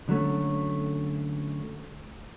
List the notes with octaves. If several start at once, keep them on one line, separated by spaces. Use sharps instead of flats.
D3 F#3 A3 C#4